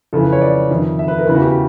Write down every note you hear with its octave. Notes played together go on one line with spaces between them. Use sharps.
F2 C#3 E3 A4
B4
C#5
D5
F2 C3 D#3
E5
B4
A#4
E2 C#3 E3 B4
F#4
G4